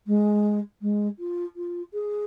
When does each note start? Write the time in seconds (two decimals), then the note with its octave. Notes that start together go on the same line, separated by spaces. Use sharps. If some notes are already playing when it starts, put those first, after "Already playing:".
0.07 G#3
0.81 G#3
1.19 F4
1.56 F4
1.93 G#4